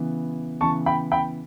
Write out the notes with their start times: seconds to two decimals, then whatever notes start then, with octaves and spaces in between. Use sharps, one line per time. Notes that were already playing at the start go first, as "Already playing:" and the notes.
Already playing: C#3 E3 B3
0.60 C#3 E3 B3 A5 C#6
0.86 G5 B5
1.12 G5 B5